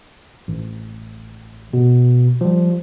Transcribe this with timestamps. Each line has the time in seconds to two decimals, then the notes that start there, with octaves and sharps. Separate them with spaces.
0.48 A1
1.73 B2
2.41 F3 G3